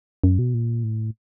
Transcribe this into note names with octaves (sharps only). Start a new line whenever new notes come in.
F#2
B2
A#2
A2